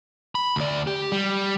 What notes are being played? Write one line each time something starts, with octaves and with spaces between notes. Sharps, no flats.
B5
D2 D5
G4
G3